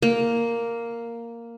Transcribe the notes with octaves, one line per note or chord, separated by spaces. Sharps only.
A#3